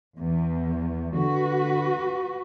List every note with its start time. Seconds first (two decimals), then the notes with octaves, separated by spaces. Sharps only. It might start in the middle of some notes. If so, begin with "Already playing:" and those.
0.17 E2
1.15 D3 F#4 B4